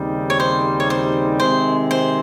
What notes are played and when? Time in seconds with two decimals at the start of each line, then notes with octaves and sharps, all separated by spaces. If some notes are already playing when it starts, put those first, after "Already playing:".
Already playing: D#2 C#3 G3 C4 D#4
0.30 C#5
0.40 C5
0.80 C#5
0.90 C5
1.40 C3 D#3 G#3 C4 C5
1.91 C5